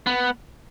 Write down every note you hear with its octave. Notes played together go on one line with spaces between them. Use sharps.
B3